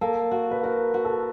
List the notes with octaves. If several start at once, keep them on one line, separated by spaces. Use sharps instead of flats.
A#3 A4
F#4
B4
F#4 A#4
F#4
A4